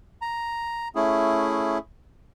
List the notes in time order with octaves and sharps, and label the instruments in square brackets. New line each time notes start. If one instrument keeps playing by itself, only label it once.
[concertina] A#5
A3 C#4 E4 G#4